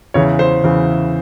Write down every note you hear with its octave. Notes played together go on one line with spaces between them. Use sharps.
E2 C#3 E3 C#5
C5
E2 C#3 E3